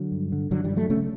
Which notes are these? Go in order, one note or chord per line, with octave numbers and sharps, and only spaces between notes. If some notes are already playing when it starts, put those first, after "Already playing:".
Already playing: D3 F#3
G2
D3
G2 D3 F#3
E3 G3
D3
F#3 A3
C#3 A3 C#4